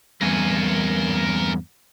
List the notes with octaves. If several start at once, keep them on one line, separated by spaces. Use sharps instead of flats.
E2 G2 A#4 G#5